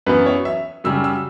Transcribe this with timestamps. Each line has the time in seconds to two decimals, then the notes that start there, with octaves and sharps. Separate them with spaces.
0.06 F#2 E3 B3 B4
0.26 C#5
0.45 E5
0.84 F#2 C#3 G3 E6
1.04 E6